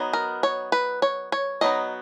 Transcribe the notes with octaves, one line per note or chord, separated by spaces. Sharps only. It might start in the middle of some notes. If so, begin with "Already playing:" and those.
Already playing: F#3 B3 D#4
A#4
C#5
B4
C#5
C#5
F#3 B3 D#4 D#5